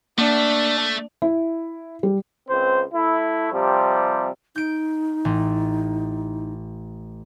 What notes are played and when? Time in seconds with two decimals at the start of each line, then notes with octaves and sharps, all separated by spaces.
0.18 A3 A#3 D4
1.22 E4
2.03 G3
2.49 C#2 C4 C5
2.94 A3 E4
3.53 C3 F3 G3
4.56 D#4 G6 D7
5.25 A1